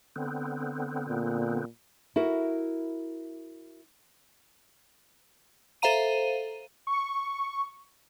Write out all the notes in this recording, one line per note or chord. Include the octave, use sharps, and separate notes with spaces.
D3 B3 C4
A#2
E4 F#4 A#4
A4 C5 E5 F5 A#5 D#7
C#6